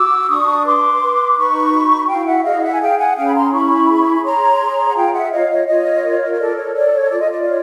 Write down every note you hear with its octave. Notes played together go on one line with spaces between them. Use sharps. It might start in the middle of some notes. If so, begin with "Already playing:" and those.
Already playing: F#4 D6 E6
D4 C#6 D#6
B4 C6 D6
B4
D#4 B5 C#6
F#4
E4 F5 G5
E5 F#5
G#4 D#5 F5
E5 F#5
G#5
G#4 F5 G5
F#5 G#5
C#4 F5 G5
B5
A#5 C6
E4 B5 C#6
G#4
C#6
C#5 A#5 C6
G#4
F#5
F4 F5 G5
E5 F#5
C#5 D#5 F5
C#5 D#5
F4 C#5 D#5
A#4
C#5
A4 D5
C#5
C#5 D5
C#5
F4 D5
D#5
D5
C#5